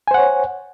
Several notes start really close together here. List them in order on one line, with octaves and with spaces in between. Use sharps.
G#5 C5 F#5 C#5